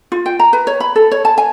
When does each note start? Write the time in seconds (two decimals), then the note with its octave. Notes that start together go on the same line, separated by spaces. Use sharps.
0.12 F4
0.26 G5
0.39 A#5
0.53 B4
0.67 C#5
0.80 B5
0.96 A4
1.11 C#5
1.25 A5
1.38 G#5